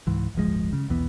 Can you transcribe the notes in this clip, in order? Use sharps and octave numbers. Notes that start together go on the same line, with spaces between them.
C#2 G#2 E3
D1 G1 F3 G#3
C#3
B1 E2 E3 B3